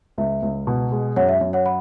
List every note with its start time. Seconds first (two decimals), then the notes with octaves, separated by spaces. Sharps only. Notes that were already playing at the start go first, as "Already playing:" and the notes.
0.18 C#2 E5
0.42 C#2
0.67 B2
0.92 G#3
1.16 F#2 C#5 F#5
1.29 E5
1.41 F#2
1.53 C#5 F#5
1.66 F#5 B5